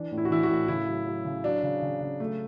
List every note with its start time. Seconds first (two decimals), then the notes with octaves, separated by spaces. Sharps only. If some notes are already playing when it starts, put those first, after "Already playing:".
Already playing: E3 D4
0.12 A2
0.18 E4
0.25 F#4
0.30 E3 E4
0.43 F#4
0.50 A2
0.68 C#3 E4
0.87 F#3
1.06 F#3
1.25 C#3
1.44 F#3 D4
1.63 C#3
1.82 C#3
2.01 C#3
2.20 F#3 A3